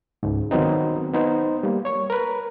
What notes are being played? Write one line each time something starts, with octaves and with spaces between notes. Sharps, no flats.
C#2 G#2
D#3 F#3 B3 C4 D#4
B3 D#4 C5
G3 A#3
C#5 C#6
A#4 B4